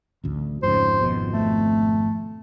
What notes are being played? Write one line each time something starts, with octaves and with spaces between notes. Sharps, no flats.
A1 D2
F2 G#2 C#3 C5
G#1 F2 B2
A3